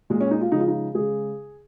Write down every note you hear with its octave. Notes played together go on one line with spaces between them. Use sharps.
A#2 G#3
C#4
D#4
F4
C#3 F3 G#3 D#4
F4
D#4
C#3 G#3 G#4